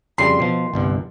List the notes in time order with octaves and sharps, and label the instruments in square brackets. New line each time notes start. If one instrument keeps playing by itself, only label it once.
[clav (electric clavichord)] F2 C#3 G3 [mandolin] C6
[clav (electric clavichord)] B2 F3
G1 C2 G2